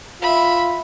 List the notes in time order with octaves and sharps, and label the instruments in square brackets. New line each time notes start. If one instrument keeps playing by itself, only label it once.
[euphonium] F4 [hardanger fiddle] E5 B5